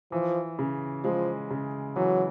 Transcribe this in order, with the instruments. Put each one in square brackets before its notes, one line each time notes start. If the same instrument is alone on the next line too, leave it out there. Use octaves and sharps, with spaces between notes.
[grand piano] E3 [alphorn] F3
[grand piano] C#3
[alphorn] F3 [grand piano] G#3
[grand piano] C#3
[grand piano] E3 [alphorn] F#3